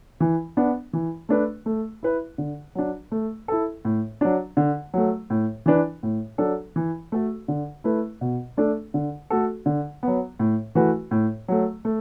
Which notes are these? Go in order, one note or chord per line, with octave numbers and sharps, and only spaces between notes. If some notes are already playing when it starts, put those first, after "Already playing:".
E3
B3 D4
E3
A3 D4 B4
A3
E4 B4
D3
F#3 D4
A3
E4 A4
A2
F#3 D4
D3
F#3 A3
A2
E3 D4 B4
A2
F#3 D4 A4
E3
A3 F#4 A4
D3
A3 E4 B4
B2
A3 D4 A4
D3
A3 F#4 A4
D3
F#3 B3
A2
E3 A3 F#4 B4
A2
F#3 A3
A3